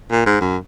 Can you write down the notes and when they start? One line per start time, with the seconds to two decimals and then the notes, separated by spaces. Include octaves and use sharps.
0.11 A#2
0.26 G#2
0.41 F#2